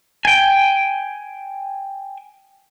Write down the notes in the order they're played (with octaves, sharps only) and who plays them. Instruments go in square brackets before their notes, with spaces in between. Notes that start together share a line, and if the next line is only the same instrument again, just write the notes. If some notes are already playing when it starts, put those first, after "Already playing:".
[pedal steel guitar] G5 G#5